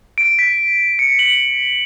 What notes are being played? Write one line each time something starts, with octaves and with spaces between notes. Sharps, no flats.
D7
B6
C#7
F#7